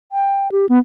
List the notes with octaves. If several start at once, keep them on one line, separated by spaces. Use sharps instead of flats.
G5
G4
B3